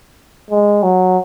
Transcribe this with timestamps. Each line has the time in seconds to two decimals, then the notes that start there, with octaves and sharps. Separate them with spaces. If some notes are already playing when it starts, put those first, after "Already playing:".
0.50 G#3
0.83 F#3